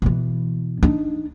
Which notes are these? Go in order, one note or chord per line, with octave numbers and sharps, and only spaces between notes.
B2 E3
D4 D#4